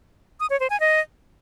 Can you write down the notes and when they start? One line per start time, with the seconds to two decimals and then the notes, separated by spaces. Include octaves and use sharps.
0.40 D#6
0.50 C#5
0.60 C5
0.70 G#5
0.80 D#5